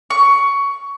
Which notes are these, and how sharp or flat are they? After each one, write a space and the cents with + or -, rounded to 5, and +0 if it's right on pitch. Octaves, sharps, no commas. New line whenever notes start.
C#6 +15